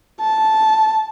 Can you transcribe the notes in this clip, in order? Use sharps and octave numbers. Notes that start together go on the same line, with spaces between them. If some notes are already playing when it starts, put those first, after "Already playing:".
A5